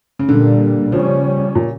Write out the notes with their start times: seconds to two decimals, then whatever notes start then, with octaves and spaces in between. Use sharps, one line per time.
0.19 C#3
0.29 A#2 D3 G3 A#3
0.92 C#3 F3 G3 C#4
1.55 A#2